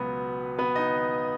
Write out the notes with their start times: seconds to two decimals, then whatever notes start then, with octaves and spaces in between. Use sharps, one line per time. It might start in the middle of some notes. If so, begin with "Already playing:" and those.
Already playing: C#2 B2 F#3 B3 B4
0.59 B3 B4
0.76 D#4 D#5